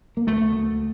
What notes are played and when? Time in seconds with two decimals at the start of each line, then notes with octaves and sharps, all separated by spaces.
0.17 A#3
0.27 D2 A3
0.56 D2